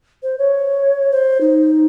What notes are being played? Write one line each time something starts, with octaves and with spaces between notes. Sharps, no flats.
C5
C#5
C5
D#4